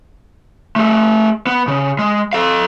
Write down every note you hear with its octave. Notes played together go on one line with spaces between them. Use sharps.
A3 G#4
B3
C#3
G#3
A4 F5